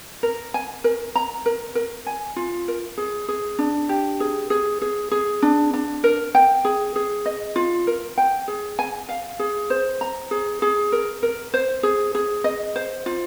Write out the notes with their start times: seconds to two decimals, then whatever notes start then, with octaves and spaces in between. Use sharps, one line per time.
0.23 A#4
0.54 G#5
0.84 A#4
1.16 A#5
1.46 A#4
1.75 A#4
2.06 G#5
2.36 F4
2.68 A#4
2.98 G#4
3.28 G#4
3.59 D4
3.89 G4
4.20 G#4
4.50 G#4
4.82 G#4
5.11 G#4
5.42 D4
5.74 D4
6.04 A#4
6.35 G5
6.65 G#4
6.96 G#4
7.26 D#5
7.56 F4
7.87 A#4
8.18 G5
8.48 G#4
8.79 G#5
9.09 F5
9.39 G#4
9.70 C5
10.01 A#5
10.31 G#4
10.62 G#4
10.92 A#4
11.23 A#4
11.54 C5
11.83 G#4
12.15 G#4
12.44 D#5
12.76 C5
13.06 F4